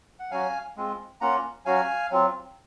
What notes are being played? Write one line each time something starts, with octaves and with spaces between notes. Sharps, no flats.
F#5
F#3 C#4 F#4 F5 G#5
G#3 C4 F4
A#3 C#4 F4 F#5 A#5
F#3 C#4 F#4 F5 G#5
F#3 C4 F4